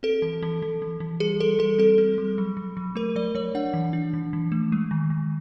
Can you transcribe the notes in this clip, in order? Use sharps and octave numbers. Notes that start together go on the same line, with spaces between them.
C4 A4
E3
E3
E3
E3
E3
G3 G#4
G3 A4
G3 A4
C4 A4
C4
G3
F#3
F#3
F#3
A3 A#4
F#3 D5
F#3 C#5
D4 F#5
E3
D4
E3
E3
A3
G#3
D#3
D#3